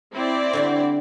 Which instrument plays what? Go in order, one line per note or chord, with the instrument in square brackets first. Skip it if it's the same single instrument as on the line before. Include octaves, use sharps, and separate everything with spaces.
[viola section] C4 E4 D5
[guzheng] D3 G3 F#4